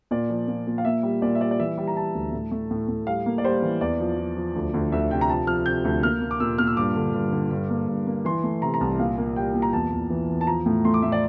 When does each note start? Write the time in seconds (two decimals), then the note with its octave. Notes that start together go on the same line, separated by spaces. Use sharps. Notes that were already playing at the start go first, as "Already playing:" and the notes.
0.11 A#2 D5
0.30 F3
0.48 A#2
0.67 A#2
0.78 F5
0.85 A#3 E5
1.03 G3
1.22 A#2 D5
1.35 E5
1.40 G3 D5
1.51 D5
1.59 E3 E5
1.78 G3
1.87 A#5
1.96 G3 A5
2.14 D2
2.33 A2
2.52 A3
2.71 A2
2.88 A2
3.07 G3 F5
3.26 A#3
3.38 D5
3.44 G3 C5
3.62 E3
3.81 E2 D5
4.00 F3
4.18 F3
4.37 F3
4.55 D2
4.74 D2
4.92 D2 E5
5.11 C3 G5
5.21 A#5
5.29 F3 A5
5.47 F3 F6
5.66 C3 G6
5.85 D2
6.03 A#3 F6
6.22 A#3
6.31 D6
6.40 A#2 E6
6.58 A#2 F6
6.67 E6
6.77 G2 D6
6.96 D3
7.14 G2
7.32 D3
7.51 G2
7.70 A#3
7.88 G2
8.07 A#3
8.25 E3 C6
8.44 A3
8.62 C3 A#5
8.74 A#5
8.80 C2 A5
8.99 A#2 F5
9.18 A#3
9.36 G3 G5
9.54 A#2
9.62 A#5
9.73 E2 A5
9.92 E2
10.10 E3
10.29 E2
10.41 A5
10.47 F3 A#5
10.66 A2
10.85 A3 C6
10.94 D6
11.02 A2 E5
11.12 D5